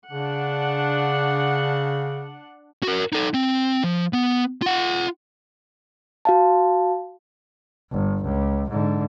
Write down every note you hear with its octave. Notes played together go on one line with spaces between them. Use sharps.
C#3 D4 F#5
F#4 A#4
D#4 A4
C4
F3
B3
F4 F#5
F#4 F5 A5
G1
C#2
G#2 D3